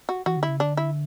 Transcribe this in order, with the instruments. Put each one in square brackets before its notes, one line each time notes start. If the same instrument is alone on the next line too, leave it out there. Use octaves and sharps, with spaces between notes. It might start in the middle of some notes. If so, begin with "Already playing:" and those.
[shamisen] F#4
[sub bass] E3 [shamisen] F#4
[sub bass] D3
[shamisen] E4
[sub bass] C#3
[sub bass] D3 [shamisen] D4
[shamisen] E4